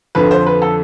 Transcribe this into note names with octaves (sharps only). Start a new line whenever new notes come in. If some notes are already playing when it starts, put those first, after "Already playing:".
F2 D3 F3 B4
C5
B4
A4